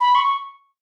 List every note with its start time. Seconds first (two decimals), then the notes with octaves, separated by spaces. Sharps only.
0.01 B5
0.15 C#6